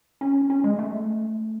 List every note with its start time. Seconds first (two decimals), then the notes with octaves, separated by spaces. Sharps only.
0.21 C#4
0.50 C#4
0.64 G#3
0.79 A3